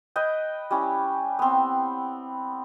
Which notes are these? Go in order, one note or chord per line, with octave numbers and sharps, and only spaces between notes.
B4 D#5 G5
G3 C#4 E4
B3 C4